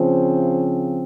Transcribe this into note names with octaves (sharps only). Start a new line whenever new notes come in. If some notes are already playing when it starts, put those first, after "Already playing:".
Already playing: C#3 F3 C4 C5